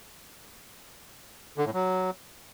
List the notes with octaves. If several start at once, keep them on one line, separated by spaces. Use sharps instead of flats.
D3
A2
F#3